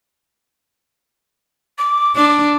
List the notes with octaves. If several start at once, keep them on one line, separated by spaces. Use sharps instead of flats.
D6
D4 D6